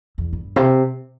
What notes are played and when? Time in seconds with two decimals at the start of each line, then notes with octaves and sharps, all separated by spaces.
0.18 E2
0.33 G2
0.56 C3